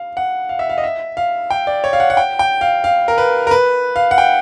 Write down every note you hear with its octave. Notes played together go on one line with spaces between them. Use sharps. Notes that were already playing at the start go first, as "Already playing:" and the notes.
Already playing: F5
F#5
F5
E5
F5
D#5
E5
F5
G5
D5
C#5
F5
F#5
F#5
G5
G5
F5
F5
A#4
B4
A#4
B4
F5
F#5
G5